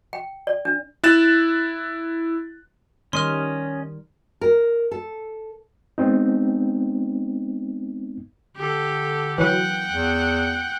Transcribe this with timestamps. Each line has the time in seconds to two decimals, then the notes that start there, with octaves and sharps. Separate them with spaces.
0.13 G5
0.47 D5
0.65 D4
1.03 E4 F#6 A6 E7
3.13 D#3 G3 C#4 A#4 D#5 C6 F6
4.41 A#4
4.91 A4
5.98 G#3 B3 C4 D#4
8.57 D3 G4 A4
9.38 E3 F#3 B4 F#5 G5
9.90 E2